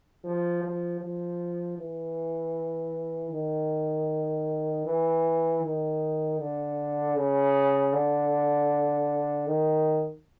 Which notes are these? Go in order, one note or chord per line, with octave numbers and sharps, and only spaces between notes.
F3
F3
F3
E3
D#3
E3
D#3
D3
C#3
D3
D#3